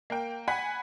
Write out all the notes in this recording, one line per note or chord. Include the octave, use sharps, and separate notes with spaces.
A#3 G5
F#5 G#5 B5 B6